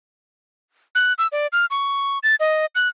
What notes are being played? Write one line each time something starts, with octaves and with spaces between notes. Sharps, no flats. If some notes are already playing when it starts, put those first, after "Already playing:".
F#6
E6
D5
F6
C#6
A6
D#5
F#6